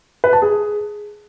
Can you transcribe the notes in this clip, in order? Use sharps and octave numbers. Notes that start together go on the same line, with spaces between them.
B4
A5
G#4